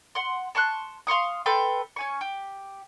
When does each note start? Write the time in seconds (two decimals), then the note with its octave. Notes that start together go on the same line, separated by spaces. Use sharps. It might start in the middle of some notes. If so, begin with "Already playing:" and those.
0.15 F#5 C6
0.55 A5 C6 C#6 F#6
1.07 F5 C6 C#6 D#6
1.46 A4 B4 G5 C6
1.96 C#4 G#5 C#6
2.21 G4